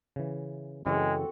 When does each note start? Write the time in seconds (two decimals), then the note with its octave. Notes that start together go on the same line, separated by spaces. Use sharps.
0.16 C#3 E3
0.86 F#2 C#3 E3 G#3 C4 F#4 A4